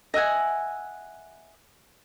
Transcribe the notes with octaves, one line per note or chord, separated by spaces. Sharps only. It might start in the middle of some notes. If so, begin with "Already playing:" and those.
D#5 E5 F#5 G#5